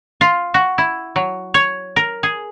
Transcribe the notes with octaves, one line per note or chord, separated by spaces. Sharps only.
F4
F#4
E4
F#3
C#5
A#4
G#4